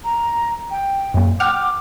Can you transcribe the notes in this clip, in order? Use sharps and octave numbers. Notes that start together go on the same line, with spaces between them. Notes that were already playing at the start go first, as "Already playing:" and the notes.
A#5
G5
F#2 A#2
F#5 G5 D6 F6